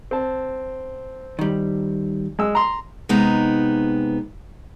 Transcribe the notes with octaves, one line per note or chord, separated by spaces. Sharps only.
C4 A5
D#3 G3
G#3 E6
A#5 C6
C3 G#3 B3 D#4 A#5